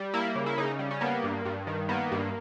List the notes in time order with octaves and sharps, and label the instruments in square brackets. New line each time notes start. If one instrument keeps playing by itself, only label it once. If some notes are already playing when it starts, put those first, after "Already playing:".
Already playing: [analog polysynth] G3
A#3 E4
C#3
E4
C#3 D#4
G3
C#4
A#3 B3
G2
G2
D#3
A#3 B3
G2